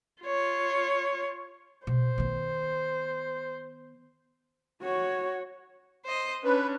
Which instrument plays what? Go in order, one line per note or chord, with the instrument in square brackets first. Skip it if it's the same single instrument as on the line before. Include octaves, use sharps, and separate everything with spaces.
[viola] F4 C#5
[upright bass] B2 [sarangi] C5
[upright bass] D#3 B3
[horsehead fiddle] F#4 C#5
[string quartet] C5 D#5
[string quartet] C#4 D4 [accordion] B4